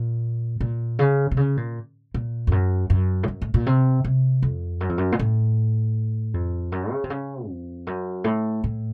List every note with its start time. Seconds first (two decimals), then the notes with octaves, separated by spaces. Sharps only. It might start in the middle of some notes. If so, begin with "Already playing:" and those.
Already playing: A#2
0.60 A#2
0.99 C#3
1.31 C3
1.37 C#3
1.57 A#2
2.14 A#2
2.47 F2
2.52 F#2
2.90 F#2
3.23 A2
3.28 F#2
3.42 A2
3.54 A#2
3.66 C3
4.04 C3
4.42 F2
4.81 F#2
4.89 F2
4.98 F#2
5.12 A#2
5.19 A2
6.34 F2
6.72 F#2
6.91 C#3
7.04 C3
7.10 C#3
7.48 F2
7.87 F#2
8.24 A2
8.64 A2